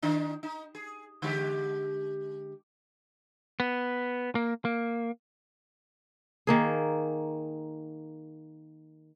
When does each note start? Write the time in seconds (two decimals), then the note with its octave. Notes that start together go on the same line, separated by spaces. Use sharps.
0.02 D#3 D4 D#4
0.43 D#4
0.75 G#4
1.22 D3 G#3 G4
3.60 B3
4.35 A#3
4.65 A#3
6.47 D#3 A#3 G#4